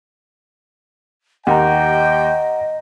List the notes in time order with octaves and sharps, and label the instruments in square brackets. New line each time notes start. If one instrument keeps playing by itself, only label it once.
[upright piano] D#2 [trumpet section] G4 G5 [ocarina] D#5 [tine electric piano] F#5 A#5